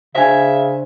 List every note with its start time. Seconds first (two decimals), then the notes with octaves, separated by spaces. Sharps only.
0.15 C#3 D4 F#4 C5 E5 G#5